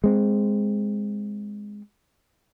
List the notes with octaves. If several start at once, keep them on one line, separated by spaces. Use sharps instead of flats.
G#3 C4